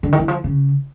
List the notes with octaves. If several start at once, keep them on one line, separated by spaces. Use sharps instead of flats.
D3
D#3
E3
F3
C#3